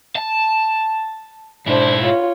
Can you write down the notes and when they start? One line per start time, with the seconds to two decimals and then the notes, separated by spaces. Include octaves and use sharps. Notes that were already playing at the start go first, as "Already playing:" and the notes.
0.16 A5
1.67 G#2 D4 E4 C5
2.01 F4 C#5